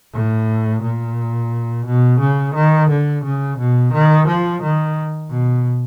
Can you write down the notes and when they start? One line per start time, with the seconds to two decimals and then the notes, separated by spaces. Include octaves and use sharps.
0.13 A2
0.82 A#2
1.86 B2
2.20 C#3
2.54 D#3
2.90 D3
3.24 C#3
3.58 B2
3.93 D#3
4.28 F3
4.62 D#3
5.30 B2